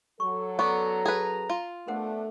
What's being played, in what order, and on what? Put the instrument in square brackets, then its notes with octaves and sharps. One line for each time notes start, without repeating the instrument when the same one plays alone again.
[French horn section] F#3 A4 [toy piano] C#6
[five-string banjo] B3 D5 [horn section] C#4 A#5 [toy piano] C#6
[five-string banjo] G#4 B4
F4
[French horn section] A3 [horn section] B3 D4 [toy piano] A#4 C5 F#5